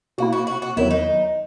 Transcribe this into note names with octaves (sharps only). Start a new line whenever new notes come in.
B2 A#3 E4 F#4
F#4
F#4
F#4
E2 D#3 F#3 E4
D#4